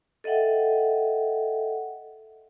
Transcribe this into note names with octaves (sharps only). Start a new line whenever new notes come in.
A4 D#5 E5 F#5 G5